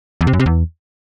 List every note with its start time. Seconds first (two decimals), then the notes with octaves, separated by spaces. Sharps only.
0.21 E2
0.27 C3
0.33 F#2
0.39 C3
0.46 E2